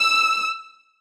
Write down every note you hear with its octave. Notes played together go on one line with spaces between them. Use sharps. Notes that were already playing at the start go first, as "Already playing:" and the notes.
Already playing: E6